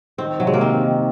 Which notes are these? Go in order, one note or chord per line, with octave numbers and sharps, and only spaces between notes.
D#3 C4
C3 F#3
G#3
A#3
D#3 C4
D#3